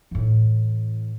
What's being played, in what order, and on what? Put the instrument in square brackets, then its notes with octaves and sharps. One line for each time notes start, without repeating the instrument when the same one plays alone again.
[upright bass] A2 E3